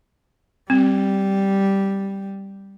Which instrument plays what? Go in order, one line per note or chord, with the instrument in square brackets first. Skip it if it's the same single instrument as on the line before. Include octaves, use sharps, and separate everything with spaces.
[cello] G3 [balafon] C4